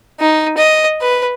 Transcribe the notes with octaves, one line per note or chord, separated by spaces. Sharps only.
D#4
D#5
B4